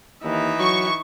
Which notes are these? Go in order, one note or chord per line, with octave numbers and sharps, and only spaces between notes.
D#2 E3 D#4 E5
F#3 C#6